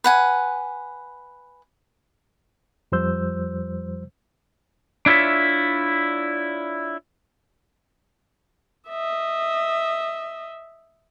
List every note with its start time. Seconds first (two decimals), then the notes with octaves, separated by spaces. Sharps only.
0.04 B4 F#5 G#5
2.92 F2 F3 G3 C5 E6 G6
5.06 D4 E4 F4 C#5 E5
8.89 D#5 E5